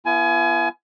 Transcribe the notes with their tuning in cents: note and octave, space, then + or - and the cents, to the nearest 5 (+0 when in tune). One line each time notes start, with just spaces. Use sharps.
B3 -15 E4 +40 G#5 +25